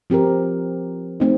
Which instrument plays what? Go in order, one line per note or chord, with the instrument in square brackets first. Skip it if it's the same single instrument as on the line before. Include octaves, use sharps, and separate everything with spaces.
[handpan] F3 C4 G4 A#4
A3 C4 D#4